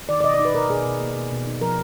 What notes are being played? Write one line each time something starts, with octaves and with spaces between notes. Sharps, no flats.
D#3 D5
D5
B2 D#5
D5
D#4
B4
B2 A#4
B2 G#4
B2
A#3
B2
B2
D#4
F3 A#4